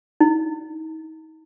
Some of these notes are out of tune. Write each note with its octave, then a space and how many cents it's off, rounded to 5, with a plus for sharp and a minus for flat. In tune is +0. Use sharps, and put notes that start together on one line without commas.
D#4 +35